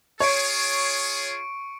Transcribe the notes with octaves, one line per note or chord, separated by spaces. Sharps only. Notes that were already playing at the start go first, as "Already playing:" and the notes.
F4 G#4 C#5 C#6 C#7 D7